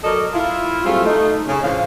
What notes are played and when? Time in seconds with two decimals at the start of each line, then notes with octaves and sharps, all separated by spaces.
0.04 F#3 A4 A#4 D5 D#5
0.33 E4 F4
0.85 F#3 G3 A3 C4 F4 G#4
1.05 A3 D#4
1.47 C#3
1.63 A2 D3 F3 G#4 F5